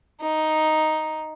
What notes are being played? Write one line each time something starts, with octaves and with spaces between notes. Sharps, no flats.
D#4